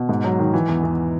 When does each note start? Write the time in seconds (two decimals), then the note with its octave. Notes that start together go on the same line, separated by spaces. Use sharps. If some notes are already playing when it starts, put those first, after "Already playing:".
Already playing: B2
0.09 G#2
0.24 F#3
0.39 D#3
0.54 E3
0.68 E2
0.83 E2